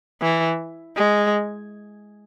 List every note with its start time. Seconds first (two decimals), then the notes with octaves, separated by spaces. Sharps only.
0.22 E3
0.96 G#3